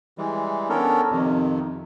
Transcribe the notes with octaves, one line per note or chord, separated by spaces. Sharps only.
E3 G3 G#3
B3 C#4 D4 A4 A#4
F2 C3 D#3